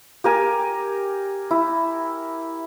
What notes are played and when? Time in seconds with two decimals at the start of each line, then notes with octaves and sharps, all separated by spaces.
0.24 G4 A#4 G#5
1.51 E4